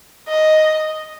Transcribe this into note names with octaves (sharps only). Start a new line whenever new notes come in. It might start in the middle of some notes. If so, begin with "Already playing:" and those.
D#5